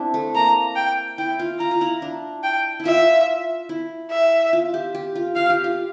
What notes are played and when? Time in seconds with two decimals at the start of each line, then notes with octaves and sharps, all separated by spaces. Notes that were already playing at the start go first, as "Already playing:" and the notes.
Already playing: C4 D4 E4
0.14 A3
0.34 A#3 A#5
0.76 G5
1.18 E4 G5
1.39 F4
1.60 F4 A#5
1.71 F4
1.81 E4
2.02 D4
2.44 G5
2.80 E4
2.85 F4 E5
3.69 E4
4.11 E5
4.53 F4
4.74 G4
4.94 G4
5.15 F4
5.36 F4 F5
5.50 G4
5.64 F4